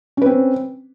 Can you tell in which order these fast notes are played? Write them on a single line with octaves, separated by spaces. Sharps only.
C#4 B4 C4